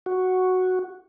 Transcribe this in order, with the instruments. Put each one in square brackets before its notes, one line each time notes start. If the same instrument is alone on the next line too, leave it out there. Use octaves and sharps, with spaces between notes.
[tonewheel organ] F#4